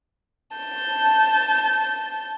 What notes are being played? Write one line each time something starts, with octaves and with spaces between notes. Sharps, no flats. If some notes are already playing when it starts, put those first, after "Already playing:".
A5 G6